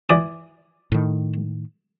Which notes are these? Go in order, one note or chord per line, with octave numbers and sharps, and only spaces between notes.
E3 D5 D#6
A2 D#3